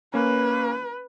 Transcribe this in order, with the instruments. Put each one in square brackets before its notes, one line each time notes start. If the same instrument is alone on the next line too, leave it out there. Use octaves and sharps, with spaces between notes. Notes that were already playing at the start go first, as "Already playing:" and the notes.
[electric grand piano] A#3 C#4 [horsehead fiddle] B4